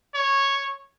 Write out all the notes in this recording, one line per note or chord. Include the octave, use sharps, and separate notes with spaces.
C#5